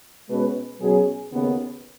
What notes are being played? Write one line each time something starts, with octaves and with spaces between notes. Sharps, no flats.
B2 G#3 C#4 B4
B2 F#3 C#4 G#4
D#2 C#3 B3